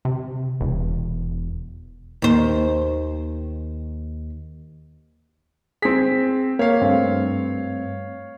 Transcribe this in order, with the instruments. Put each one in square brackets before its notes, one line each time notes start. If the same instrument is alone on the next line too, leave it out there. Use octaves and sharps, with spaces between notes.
[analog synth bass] C3
E1
[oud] D#2 C5
[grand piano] C4 B6 [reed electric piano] G#4
[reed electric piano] A#3 [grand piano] C#5 F5
[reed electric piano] G2 A3 C4